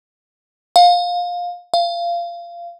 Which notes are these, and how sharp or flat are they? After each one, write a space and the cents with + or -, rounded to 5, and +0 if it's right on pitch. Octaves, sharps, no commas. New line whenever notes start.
F5 +20
F5 -20